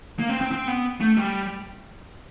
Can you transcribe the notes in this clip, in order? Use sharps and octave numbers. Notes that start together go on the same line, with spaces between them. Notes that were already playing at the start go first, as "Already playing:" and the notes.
A#3
C4
C4
C4
B3
A3
G3